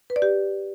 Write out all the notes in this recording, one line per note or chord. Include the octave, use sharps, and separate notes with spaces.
B4
D5
G4